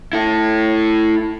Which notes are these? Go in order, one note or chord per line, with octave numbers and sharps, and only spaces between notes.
E4 A4